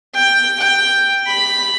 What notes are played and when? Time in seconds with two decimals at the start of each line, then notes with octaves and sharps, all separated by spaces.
0.15 G5
0.60 G5
1.27 B5